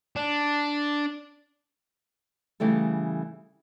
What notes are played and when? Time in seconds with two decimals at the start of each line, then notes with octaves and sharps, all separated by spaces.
0.16 D4
2.60 C#3 E3 G3 A3 A4